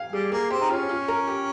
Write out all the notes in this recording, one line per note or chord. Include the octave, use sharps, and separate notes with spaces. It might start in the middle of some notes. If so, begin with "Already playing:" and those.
Already playing: F5 G5 G#5
G3 G#4
A#3 G#4
C4 G4
D#4
C#4 F4
F4
A#4
G4